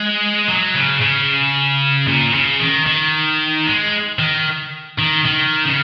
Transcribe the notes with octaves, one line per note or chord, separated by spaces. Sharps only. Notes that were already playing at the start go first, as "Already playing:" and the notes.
Already playing: G#3
F#3
C#3
C#3
A#2
C#3
D#3
D#3
G#3
D#3
D#3
D#3
C#3